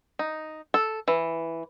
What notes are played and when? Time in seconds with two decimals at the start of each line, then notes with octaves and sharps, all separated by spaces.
0.19 D#4
0.74 A4
1.08 E3